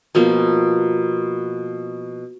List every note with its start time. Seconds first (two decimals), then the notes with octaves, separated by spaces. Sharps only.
0.15 B2 F3 A#3